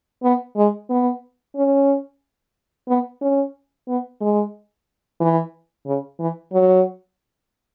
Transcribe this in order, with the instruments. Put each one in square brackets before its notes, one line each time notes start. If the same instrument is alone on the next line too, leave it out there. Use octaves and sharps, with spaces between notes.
[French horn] B3
G#3
B3
C#4
B3
C#4
B3
G#3
E3
C#3
E3
F#3